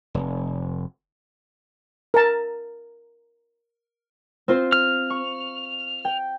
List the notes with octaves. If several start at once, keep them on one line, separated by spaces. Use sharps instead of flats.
F1
A#4 A5
C4 F4 C5
F6
C#6
G5